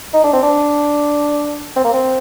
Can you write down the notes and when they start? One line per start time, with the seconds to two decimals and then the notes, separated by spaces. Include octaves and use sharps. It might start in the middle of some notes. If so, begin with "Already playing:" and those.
0.13 D#4
0.23 D4
0.33 C4
0.43 D4
1.76 C4
1.84 A#3
1.93 C4